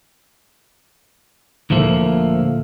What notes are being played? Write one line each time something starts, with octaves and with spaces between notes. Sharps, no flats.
D2 A#2 F3 A3 A#3